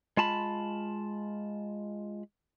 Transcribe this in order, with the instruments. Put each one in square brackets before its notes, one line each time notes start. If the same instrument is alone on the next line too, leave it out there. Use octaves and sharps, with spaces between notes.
[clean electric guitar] G#3 F4 A5 B5